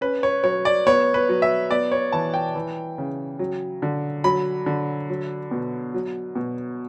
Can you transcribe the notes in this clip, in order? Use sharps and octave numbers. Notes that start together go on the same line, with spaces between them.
C#4 B4
C#5
F#3 C#5
D5
B3 C#5
B4
F#3
E5
B3 D5
C#5
E3 A5
G5
E3
C#3
F#3
D3
F#3 B5
D3
F#3
B2
F#3
B2